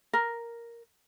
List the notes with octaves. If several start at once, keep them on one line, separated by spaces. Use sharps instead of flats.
A#4